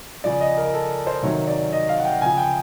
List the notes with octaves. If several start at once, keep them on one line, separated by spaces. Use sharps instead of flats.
C#3 F3 D5
D#5
A#4
A4
C5
C3 D#3 F#3 C#5
D5
D#5
F5
F#5
G5
C#3 F3 G#5
G5